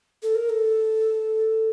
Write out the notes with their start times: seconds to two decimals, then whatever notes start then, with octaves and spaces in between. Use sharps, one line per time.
0.23 A4
0.35 A#4
0.49 A4